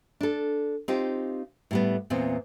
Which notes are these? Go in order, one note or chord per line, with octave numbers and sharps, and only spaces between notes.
D4 A4
C4 D#4 F4 G4
A2 G3 B3
E2 A#2 B3 C4